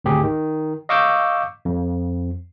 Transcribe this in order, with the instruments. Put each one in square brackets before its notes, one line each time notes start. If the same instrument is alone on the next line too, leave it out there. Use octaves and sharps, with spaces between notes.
[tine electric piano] G#1 D2 G4 G#4
D#3
D#5 F5 C#6 D6 E6 G6
F2